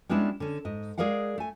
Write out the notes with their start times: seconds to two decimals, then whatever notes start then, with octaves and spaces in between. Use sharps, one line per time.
0.09 G3 G#3 B3 C#4 D4 E4
0.40 D3 C#4
0.65 G#2 D#5
0.98 G#3 G#4 A#4 D5 F5 F#5
1.38 A3 G#5